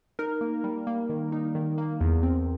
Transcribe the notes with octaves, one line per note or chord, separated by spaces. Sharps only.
D#4 A#4
A#3
G3
A#3
D#3
D#4
D#3
A#3
E2
C4